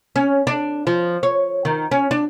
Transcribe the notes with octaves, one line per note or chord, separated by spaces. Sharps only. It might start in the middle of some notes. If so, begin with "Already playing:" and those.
C#4
D4
F3
C#5
D#3
C#4
D4